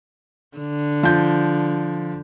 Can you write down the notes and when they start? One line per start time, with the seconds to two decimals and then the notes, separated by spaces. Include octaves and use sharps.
0.57 D3
1.03 F3 G6